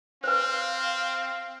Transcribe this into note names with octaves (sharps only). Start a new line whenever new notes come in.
C4 B4 C5 F5